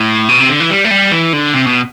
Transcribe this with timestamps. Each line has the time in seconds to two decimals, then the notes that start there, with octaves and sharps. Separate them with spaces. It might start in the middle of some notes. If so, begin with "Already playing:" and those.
Already playing: A2
0.29 B2
0.40 C3
0.50 D3
0.60 E3
0.70 G3
0.85 A3
0.91 G3
1.12 E3
1.33 D3
1.53 C3
1.67 B2